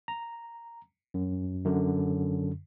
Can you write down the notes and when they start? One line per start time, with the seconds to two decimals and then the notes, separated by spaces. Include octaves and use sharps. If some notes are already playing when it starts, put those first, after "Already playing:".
0.08 A#5
1.14 F#2
1.65 F#2 D3